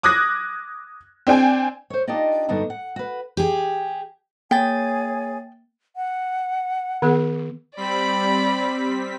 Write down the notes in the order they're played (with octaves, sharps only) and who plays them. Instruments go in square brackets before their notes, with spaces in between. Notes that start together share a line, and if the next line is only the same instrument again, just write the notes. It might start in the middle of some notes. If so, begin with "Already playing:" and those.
[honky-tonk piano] D6 D#6 F#6 G#6 A#6
C4 D4 G5 G#5
[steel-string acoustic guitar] C5 C#5
D4 D#4 F4 G4 D5 D#5
G2 D3 B3 D4 D#4 F#4
F#5
F#4 B4
G4 G#4
[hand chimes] A#3 A6 [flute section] G#4 C#5 G#5 [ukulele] G5
[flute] F#5
[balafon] D#3 B3 G#4
[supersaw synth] G3 C4 B6 [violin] D5 B5